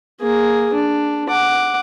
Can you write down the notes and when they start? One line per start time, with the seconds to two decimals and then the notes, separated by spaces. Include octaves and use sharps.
0.21 A#3 G#4
0.73 D4
1.29 F#5 D6